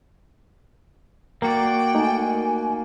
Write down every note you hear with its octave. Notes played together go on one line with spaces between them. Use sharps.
A#3 F#4 A#4 D5 G5
A3 D#4 G#5